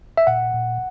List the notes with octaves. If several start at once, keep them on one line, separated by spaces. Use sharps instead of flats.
E5
A#2 F#5
A#2